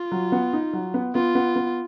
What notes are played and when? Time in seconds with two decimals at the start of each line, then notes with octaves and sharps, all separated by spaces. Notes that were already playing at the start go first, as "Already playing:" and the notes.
Already playing: F4
0.12 F#3
0.32 B3
0.53 D#4
0.73 F#3
0.94 B3
1.15 B3 F4
1.35 B3
1.56 B3